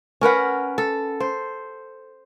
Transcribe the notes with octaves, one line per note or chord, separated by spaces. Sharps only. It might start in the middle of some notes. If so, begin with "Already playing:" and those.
C#4 A#4 B4 F#5
A4
C5